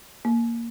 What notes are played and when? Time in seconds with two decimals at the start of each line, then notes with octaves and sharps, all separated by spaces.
0.25 A#3